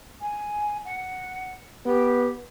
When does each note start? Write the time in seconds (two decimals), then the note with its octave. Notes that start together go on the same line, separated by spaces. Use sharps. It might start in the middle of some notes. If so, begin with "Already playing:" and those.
0.21 G#5
0.85 F#5
1.85 B3 G4